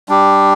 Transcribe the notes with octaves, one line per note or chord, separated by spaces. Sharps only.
G3 D4 G4